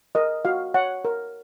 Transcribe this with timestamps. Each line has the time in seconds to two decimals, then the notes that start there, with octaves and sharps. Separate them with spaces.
0.15 A#4 D#5
0.45 F#4 F5
0.74 C#5 F#5
1.05 A#4